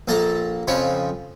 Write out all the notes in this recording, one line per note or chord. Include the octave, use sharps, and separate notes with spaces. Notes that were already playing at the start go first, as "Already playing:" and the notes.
A#1 A#3 A4 A5 A#5
F2 C#3 F3 C#5 B5 C#6